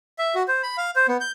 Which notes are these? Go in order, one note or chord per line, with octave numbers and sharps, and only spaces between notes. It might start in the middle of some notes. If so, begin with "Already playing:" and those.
E5
F#4
C5
B5
F5
C5
B3
G6